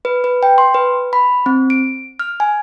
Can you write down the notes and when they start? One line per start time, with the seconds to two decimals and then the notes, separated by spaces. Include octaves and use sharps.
0.05 B4
0.24 B4
0.43 G5
0.58 C6
0.74 B4
1.13 B5
1.46 C4
1.70 D7
2.19 F6
2.40 G#5